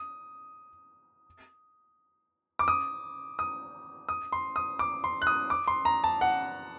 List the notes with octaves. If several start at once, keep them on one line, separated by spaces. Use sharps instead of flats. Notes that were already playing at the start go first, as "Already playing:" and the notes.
Already playing: D#6
D6
D#6
D#6
D#6
C6
D#6
D6
C6
F#6
D#6
D6
C6
A#5
A5
F#5